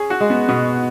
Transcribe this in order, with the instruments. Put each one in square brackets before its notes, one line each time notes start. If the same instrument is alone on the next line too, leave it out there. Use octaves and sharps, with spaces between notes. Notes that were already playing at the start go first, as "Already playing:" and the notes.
Already playing: [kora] C#4 [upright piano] G#4
[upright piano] F#4
[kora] G#3
[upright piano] B3
[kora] B2 [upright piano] B3